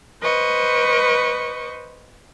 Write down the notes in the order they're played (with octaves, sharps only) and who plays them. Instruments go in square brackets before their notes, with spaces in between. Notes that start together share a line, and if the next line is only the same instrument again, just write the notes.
[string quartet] B4 C5 D#5 C#6